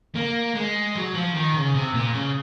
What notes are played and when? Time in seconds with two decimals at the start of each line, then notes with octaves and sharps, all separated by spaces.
0.15 A#3
0.55 G#3
0.95 F#3
1.14 F3
1.34 D#3
1.54 C#3
1.74 C3
1.94 A#2
2.13 C#3